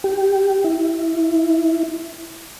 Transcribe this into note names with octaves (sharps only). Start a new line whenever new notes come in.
G4
E4